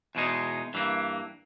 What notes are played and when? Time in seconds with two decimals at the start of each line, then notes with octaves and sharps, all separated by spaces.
0.15 E2 B2 G#3 D#4
0.74 G2 E3 A#3